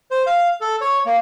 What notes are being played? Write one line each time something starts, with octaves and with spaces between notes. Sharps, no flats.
C5
F5
A4
C#5
A#3